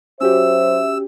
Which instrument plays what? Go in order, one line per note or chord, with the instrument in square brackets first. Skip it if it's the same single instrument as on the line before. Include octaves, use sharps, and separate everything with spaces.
[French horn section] F#3 C5 [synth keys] C#4 F#4 G4 [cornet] E5 [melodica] E6